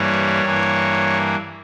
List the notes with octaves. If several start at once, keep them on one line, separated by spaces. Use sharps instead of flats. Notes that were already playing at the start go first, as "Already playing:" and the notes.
Already playing: G2 E3 G3 A#3 C#5
G2 E3 A#3